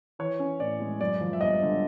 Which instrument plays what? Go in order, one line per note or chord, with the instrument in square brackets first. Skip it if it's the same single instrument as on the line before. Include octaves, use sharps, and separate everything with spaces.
[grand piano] E3 C#5
C#4
A2 D5
G#3
F#2 D5
F3
E5
G1 D#5
D3